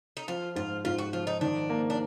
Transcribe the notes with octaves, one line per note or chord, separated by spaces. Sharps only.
D#4
F3 F4
G#2 F4
G#2 F4
F#4
F3 F4
D#4
D#3 D4
A#3
D4